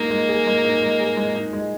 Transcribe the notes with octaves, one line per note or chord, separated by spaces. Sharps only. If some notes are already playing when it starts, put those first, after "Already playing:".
Already playing: G#3 A#3 D#4
G#3
G#4
G#3
D#4
G#3
G#4
G#3
D#4
G#3